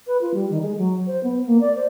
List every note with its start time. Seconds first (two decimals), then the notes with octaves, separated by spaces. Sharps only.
0.07 B4
0.21 F4
0.34 G3
0.50 D#3
0.62 G#3
0.77 F#3
1.07 C5
1.23 B3
1.46 A#3
1.60 D5
1.76 C5